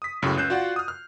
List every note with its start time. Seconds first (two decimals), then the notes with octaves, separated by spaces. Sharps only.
0.02 D#6 B6
0.22 C#2 F#2 A2 C#3 F#3
0.37 C#2 C#4 F#6 G6 C7 E7
0.50 F4 F#4 D5 F#5
0.76 D#6 F6
0.88 F6